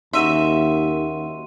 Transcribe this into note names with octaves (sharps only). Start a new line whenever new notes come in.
D#2 C#4 D#4 F#4 E5 C6 D#7